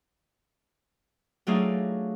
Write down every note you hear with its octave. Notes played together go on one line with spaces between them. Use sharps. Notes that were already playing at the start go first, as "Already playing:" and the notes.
F#3 A3 D4 D#4 F4 G#4